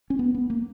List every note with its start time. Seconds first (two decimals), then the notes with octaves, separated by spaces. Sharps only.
0.10 C#4
0.19 B3
0.35 B3
0.50 A#3